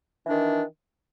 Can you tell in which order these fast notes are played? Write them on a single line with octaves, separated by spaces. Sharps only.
E3 D4 D#3